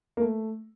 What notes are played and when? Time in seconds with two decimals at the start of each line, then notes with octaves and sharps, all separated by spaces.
0.17 A#3
0.21 A3